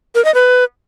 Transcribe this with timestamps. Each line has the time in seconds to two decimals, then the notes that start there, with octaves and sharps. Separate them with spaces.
0.15 A#4
0.25 D#5
0.34 B4